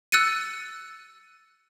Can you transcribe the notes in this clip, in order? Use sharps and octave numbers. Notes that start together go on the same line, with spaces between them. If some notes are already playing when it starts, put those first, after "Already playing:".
E6 F#6 A6 C#7 D#7